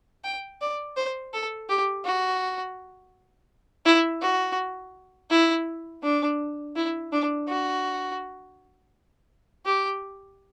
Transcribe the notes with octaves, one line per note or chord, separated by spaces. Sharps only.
G5
D5
C5
A4
G4
F#4
E4
F#4
E4
D4
E4
D4
F#4
G4